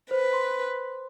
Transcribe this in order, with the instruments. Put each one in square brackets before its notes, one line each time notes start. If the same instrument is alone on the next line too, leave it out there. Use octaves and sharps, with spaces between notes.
[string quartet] B4 [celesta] C5
[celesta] C6